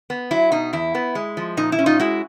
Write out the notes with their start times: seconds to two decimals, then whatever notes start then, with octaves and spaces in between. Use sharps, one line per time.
0.10 B3
0.31 F#3 E4
0.52 B2 D#4
0.73 E2 E4
0.95 B3
1.15 G#3
1.37 F3
1.57 A#2 D#4
1.72 E4
1.79 C#4
1.86 D#4 F4
1.99 G#3 E4 F#4